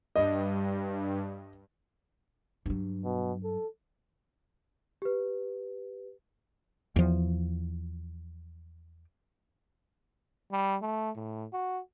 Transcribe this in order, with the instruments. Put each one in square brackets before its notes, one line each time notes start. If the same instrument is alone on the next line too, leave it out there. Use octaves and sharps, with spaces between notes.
[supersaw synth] G2 [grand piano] D#5
[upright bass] G2 F#3
[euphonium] B2
A4
[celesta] G4 B4
[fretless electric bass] E2 F3
[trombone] G3
A3
A2
F#4